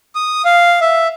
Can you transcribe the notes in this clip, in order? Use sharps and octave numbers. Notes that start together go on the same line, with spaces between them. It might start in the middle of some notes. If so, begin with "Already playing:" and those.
D#6
F5
E5